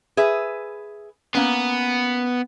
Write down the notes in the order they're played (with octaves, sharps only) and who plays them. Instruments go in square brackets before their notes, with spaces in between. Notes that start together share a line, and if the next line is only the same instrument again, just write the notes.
[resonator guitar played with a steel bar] G#4 B4 E5
[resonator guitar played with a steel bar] A#3 C#4 [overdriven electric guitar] B3